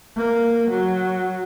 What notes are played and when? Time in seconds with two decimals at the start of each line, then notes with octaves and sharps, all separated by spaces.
0.17 A#3
0.70 F#3